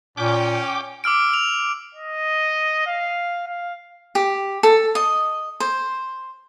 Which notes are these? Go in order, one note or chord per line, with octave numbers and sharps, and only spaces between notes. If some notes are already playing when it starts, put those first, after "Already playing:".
A#2 C#4 G5 D6
D6 E6 F6 D7
F7
D#5
F5
F5
G4
A4
D#5
C5